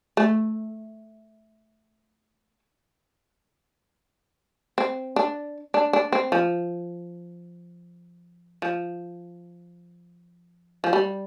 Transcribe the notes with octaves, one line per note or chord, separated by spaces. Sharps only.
A3
C4
D4
D4
D4
C4
F3
F3
F3
G3